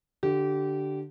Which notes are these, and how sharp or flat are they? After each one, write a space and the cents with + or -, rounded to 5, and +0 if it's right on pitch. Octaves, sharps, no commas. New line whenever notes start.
D3 +0 G4 -25